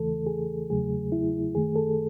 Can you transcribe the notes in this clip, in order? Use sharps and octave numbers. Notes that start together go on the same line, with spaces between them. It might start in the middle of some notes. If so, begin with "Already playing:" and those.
Already playing: E2 C#3 E3 A3 A4
G#4
E2 C#3 F#3 A3 G#4
E4
F#2 D#3 A3 G#4
A4